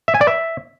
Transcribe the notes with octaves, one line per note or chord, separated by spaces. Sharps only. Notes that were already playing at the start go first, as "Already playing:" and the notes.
E5
G#5
D5
E5